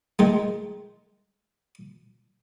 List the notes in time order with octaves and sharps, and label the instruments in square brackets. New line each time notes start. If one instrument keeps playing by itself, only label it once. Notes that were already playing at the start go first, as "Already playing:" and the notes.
[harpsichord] D#3 G#3 A3